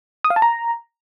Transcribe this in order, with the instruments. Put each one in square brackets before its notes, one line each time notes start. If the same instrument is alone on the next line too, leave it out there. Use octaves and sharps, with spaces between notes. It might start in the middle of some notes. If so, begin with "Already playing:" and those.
[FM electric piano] D#6
F5
A5
A#5